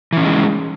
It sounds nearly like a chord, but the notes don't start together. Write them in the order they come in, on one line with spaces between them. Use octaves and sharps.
E3 C#4 D#4 G#3